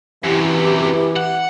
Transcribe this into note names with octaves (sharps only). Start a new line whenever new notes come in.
F#2 C3 E3 G4
F#5